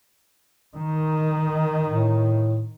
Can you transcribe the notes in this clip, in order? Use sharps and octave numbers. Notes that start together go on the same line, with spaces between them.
D#3
A2